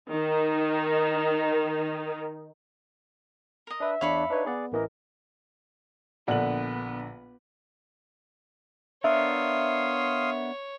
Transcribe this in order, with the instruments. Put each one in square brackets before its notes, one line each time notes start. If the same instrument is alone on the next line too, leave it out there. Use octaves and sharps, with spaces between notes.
[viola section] D#3 D#4
[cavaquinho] A#4 D#5
[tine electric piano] D4 B4 [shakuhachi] E5
[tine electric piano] E2 C#5 [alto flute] D4 [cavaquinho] F5 B5 C#6
[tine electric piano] D4 D#4 C#5 [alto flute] B4
[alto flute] B3 [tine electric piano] G#4 D5 F#5
[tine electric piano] A1 E3 D#5 [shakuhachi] A#4
[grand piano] A#1 D3 F#7 [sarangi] B3 [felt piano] D5 F#5
[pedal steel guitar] B3 D4 A#4 [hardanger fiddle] C#5 [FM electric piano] E5 [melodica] F5 C6 D#6